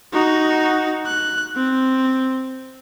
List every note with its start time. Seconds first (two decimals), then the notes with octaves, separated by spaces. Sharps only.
0.12 D#4 F#4
1.06 F#6
1.55 C4